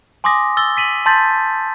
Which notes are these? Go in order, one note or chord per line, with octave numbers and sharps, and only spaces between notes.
G#5 C6 D6 D#6 A#6
E6 A6 G7
B6 D#7 F#7
A5 C6 G6 A6 B6